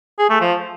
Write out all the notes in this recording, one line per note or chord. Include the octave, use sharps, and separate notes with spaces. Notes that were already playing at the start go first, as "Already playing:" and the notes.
G#4
A3
F3